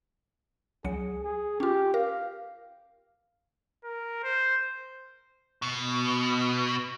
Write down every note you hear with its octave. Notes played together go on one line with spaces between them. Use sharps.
C#2 F#3 G#4 C#7
G#4
C#4 F4 G4
A#4 F5
A#4
C5
B2